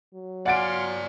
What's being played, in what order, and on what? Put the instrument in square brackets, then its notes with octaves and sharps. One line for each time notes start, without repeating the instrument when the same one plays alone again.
[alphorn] F#3
[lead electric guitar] D5 G#5 [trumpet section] F5 C6 [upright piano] F#5 A6 D7